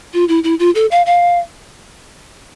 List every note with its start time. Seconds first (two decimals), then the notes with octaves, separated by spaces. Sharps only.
0.14 F4
0.29 E4
0.44 E4
0.59 F4
0.75 A4
0.91 F5
1.06 F5